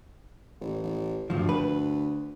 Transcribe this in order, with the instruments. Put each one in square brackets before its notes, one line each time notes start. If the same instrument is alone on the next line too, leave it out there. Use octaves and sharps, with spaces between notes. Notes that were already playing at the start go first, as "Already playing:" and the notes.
[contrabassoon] A1
A1
[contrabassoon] D2 [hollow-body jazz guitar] G2 F3
[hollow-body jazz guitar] B4